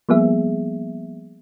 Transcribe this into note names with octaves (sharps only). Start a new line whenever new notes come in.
F3 G3 A#3 B3 G#4 E5